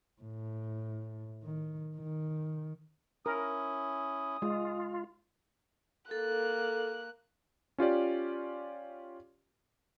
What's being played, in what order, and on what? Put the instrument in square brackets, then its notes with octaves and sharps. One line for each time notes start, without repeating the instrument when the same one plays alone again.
[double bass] A2
D#3
D#3
[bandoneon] C#4 E4 [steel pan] A#4 [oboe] D#6
[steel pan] G#3 [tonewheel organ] F4
[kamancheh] A#3 F#6 [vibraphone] A4
[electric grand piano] C#4 F4 G4 D5